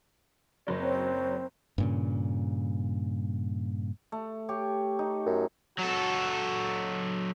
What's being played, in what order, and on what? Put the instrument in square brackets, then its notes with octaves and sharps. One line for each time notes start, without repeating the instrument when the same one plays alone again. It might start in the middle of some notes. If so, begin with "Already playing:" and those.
[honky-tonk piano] F#1 F#3 C#4
[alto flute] C4
[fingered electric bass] G2 A#2 C#3
[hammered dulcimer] A3
G4 C#5
D#4
[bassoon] F#2
[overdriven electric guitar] F#3 A4 [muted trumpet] F#4